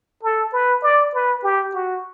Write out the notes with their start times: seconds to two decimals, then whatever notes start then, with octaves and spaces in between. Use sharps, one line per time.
0.23 A4
0.53 B4
0.83 D5
1.14 B4
1.43 G4
1.74 F#4